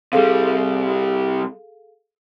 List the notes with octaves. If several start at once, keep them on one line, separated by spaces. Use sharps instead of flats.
C3 G3 G#4 A4 F5